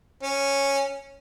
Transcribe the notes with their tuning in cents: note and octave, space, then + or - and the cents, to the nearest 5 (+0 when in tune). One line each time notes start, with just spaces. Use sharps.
C#4 -5